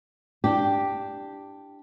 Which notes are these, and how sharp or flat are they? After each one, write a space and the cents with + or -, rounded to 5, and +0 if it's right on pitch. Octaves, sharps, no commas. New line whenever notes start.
D4 +0 G4 +0